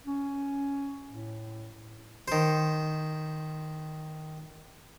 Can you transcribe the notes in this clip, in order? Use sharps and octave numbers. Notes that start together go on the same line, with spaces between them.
C#4
A2
D#3 C5